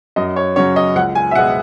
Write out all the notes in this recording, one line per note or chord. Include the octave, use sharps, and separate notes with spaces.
F#2 D#5
C#5
C#3 F#3 C#4 C#5
D#5
C#2 F#5
G#5
E5
B2 G#3 B3 F#5